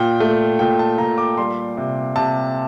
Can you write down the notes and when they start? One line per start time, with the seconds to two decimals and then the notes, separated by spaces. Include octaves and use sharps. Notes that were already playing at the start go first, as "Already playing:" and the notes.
Already playing: A#2 G5
0.20 A3
0.59 A#2 G5
0.79 A5
0.98 A#2 A#5
1.18 D6
1.37 G3 C6
1.77 C3
2.16 C3 A5